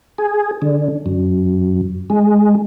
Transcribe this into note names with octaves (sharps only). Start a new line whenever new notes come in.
G#4
D3
F#2
G#3